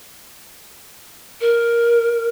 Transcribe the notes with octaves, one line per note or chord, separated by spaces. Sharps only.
A#4